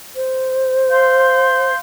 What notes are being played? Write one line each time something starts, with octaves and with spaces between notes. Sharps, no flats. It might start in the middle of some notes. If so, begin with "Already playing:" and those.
C5
F5 C6 G6